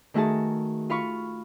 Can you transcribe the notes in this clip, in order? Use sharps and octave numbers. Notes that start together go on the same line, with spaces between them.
D#3 A3 F#4 G#4 A5
F4 F5 B5 C#6